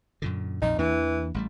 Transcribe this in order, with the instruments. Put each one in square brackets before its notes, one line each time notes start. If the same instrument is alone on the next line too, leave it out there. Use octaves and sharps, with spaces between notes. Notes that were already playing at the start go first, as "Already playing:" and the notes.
[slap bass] F#2 A#2 D3
[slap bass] A#1 F2 A#2 [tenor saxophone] D#4
[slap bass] E2 A#3 D4 [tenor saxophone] E3
[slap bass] A1 G3 A3